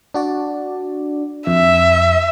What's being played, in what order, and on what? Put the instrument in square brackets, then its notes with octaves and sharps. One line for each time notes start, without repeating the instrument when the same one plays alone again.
[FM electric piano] D4 F#4 D5
[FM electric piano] F2 [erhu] E5